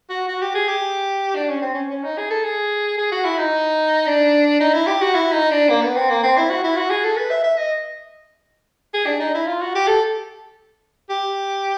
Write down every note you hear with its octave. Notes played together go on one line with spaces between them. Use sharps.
F#4
F#4
G4
G#4
G4
D4
C#4
C4
C#4
C#4
D#4
G#4
A4
G#4
G#4
F#4
E4
D#4
D4
D#4
E4
G4
F#4
E4
D#4
D4
A#3
B3
C4
A#3
C4
E4
F#4
E4
F#4
G#4
A4
B4
E5
E5
D#5
G#4
D4
D#4
E4
F4
F#4
G4
A4
G4